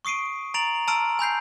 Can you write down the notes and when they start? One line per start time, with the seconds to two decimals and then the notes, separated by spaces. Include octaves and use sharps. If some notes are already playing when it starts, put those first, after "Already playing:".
0.05 C#6 D#6 C7 D7 D#7
0.54 A#5 A6 D7 F7 F#7
0.88 A5 A#5 C6 E6 F6 D7
1.19 G#5 B5 G6 C7